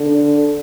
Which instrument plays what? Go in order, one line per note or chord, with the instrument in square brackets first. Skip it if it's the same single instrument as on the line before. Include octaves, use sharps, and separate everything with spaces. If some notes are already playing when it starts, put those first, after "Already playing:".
Already playing: [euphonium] D3